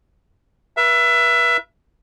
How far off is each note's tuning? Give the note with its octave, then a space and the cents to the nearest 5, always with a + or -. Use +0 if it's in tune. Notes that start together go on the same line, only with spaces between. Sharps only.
B4 -40 E5 +20